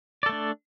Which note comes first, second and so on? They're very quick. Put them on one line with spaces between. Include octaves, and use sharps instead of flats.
D5 A4 A3 D4